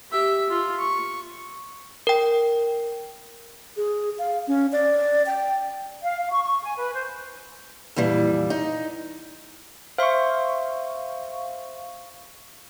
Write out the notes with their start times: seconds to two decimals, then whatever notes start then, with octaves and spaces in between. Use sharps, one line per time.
0.11 G4 E5
0.49 F4
0.80 C#6
2.07 A#4 G5
3.77 G#4
4.19 F5
4.48 C#4
4.72 D5
5.26 G5
6.02 F5
6.18 F5
6.30 C#6
6.42 C#6
6.62 G#5
6.77 B4
6.93 C5
7.96 F2 A#2 E3 G3
8.50 D#4
9.98 C5 E5 F5 C6 C#6